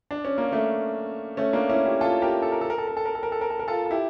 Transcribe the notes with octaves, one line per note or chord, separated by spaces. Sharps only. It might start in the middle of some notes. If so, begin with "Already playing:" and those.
D4
C#4
A#3
A3 C#4
A3 C#4
A#3 D4
C#4 E4
E4 G4
F4 A4
G4 A#4
A4
A#4
A4
A#4
A4
A#4
A4
A#4
A4
A#4
A4
A#4
A4
A#4
F4 A4
A4
E4 G4